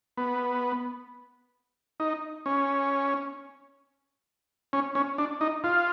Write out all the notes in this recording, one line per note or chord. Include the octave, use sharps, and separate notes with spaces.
B3
D#4
C#4
C#4
C#4
D4
D#4
F4